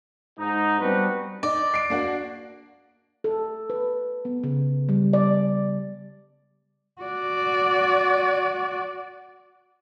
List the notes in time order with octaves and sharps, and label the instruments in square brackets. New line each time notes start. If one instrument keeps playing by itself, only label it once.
[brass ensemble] G#2 D#4
G3 B3 C4 D4 F#4 B4
[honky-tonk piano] D#4 [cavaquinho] D5
[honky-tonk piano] C7 D7
A#3 D4 F#4
[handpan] A4
B4
B3
C#3
G3
D5
[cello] F#4 D5